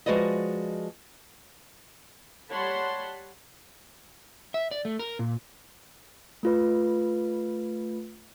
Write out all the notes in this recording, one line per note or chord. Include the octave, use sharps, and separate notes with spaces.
F3 G#3 F#4 B4 D5 D#5
G3 C#5 F#5 A5 B5 C6
E5
D5
A3
A#4
A#2
A3 F4 B4